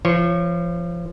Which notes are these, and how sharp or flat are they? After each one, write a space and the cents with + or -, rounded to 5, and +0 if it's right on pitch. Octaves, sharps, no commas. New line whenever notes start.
F3 -30 C#5 -15